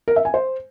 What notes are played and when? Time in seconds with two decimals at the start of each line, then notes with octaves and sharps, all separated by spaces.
0.08 A#4
0.16 E5
0.25 G#5
0.34 C5